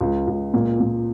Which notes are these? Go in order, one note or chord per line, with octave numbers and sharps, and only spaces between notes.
C#2
C#2
A#2
A#2